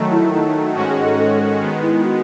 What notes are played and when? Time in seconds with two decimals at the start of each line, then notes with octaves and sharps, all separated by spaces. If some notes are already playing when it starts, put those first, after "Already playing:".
Already playing: D#3 F#3 A3
0.11 E4
0.32 D#4
0.75 G#2 D#3 G#3 C#4 F#4
0.89 G#4
1.04 A4
1.18 A4
1.61 D#3 G#3 B3
1.82 E4
2.04 F#4